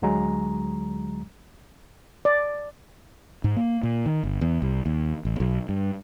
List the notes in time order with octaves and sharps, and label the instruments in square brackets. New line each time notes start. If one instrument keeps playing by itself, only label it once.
[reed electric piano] D2 D3 F#3 G#3 A#5
[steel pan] D5
[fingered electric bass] G#2
A#3
A#2
D#3
G1
E2
C2
D#2
A1
B1
G2